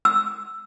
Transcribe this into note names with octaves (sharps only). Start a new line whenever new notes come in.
E6